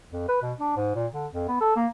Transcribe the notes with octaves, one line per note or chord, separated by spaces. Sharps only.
F2
B4
B2
D4
G#2
A#2
D3
F2
B3
A4
A#3